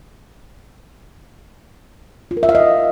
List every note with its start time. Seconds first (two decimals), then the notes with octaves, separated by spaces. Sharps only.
2.31 F4
2.37 A#4
2.43 E5
2.49 F5
2.55 D#5